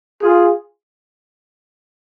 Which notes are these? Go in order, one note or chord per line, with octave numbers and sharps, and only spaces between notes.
F4 G#4